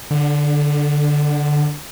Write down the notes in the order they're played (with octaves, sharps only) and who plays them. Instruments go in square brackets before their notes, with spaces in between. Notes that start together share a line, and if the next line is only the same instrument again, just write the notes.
[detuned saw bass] D3